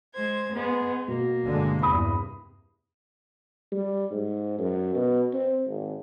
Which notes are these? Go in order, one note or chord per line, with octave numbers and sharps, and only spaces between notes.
G#3 C5 G#6
G#3 B3
B2 A#3
G1 D3 G#3
E2 G2 C3 B5 D#6
G3
G#2
F#2
B2
C4
G#1